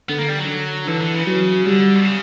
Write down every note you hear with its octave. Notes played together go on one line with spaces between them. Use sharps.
D3 B3
A#3
G3
F#3
D3
D3 E3
D3
C#3
F#3
D3 G3
B2
C#3